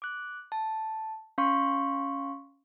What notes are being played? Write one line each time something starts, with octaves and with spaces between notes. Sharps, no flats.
D6 F#6
A5
C#4 F5 C6 C#6